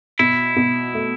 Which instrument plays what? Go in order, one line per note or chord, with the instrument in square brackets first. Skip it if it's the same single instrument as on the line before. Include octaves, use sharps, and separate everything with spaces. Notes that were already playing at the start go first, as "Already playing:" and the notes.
[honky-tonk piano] B2 [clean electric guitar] E4
[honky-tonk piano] B2
A3